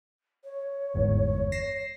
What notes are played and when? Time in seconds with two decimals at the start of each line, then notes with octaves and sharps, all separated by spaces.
0.44 C#5
0.94 G1 E2 G#2
1.52 A#6 C7 E7